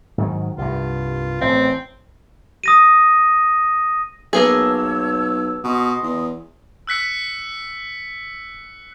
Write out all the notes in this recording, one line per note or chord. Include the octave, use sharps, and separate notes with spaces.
G#2 D#3 F#3
C2 G2 F4
A1 C4
D#6 A#6 D#7
B1 A#3 B3 G#4 C#5 A5 E6
B2 D#5 C6 D#6
E2
E6 F#6 B6 C#7